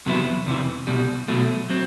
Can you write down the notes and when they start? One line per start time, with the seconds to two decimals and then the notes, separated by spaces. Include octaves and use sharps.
0.06 E2 C3 F#3 B3 E4
0.46 E2 C3 E3
0.87 C2 B2 G3
1.28 B2 F#3 A3
1.70 F#3 C4